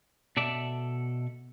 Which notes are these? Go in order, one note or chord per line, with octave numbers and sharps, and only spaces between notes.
B2 A4 D5 E5